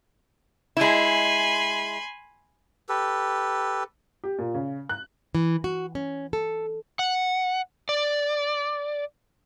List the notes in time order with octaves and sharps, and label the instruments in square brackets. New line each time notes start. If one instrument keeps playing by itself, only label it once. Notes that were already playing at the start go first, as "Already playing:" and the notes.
[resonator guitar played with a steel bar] G#3 E4 [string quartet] G#5 B5 C6
[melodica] G4 A4 B4
[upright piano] G4
A#2
C#3
F#6
[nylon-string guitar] E3
F#4
C#4
A4
[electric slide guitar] F#5
D5